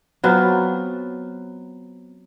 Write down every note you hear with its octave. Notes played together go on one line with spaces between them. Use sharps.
F#3 B3 C4 F4